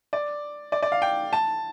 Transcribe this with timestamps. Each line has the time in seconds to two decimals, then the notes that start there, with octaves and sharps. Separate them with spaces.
0.13 D5
0.72 D5
0.82 D5
0.92 F5
1.02 G5
1.33 A5